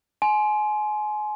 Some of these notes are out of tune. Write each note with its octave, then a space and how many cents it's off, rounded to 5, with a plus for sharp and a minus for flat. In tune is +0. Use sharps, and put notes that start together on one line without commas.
G#5 +30 C6 +0